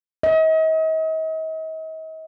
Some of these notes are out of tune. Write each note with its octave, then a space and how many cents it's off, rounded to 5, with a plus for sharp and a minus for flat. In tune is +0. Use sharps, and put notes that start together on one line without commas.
D#5 +40